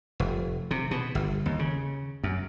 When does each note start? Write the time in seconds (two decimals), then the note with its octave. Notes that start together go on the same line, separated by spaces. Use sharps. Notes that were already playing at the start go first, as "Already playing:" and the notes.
0.20 F1
0.71 C3
0.91 B2
1.15 G1
1.46 D#2
1.59 C#3
2.24 F#2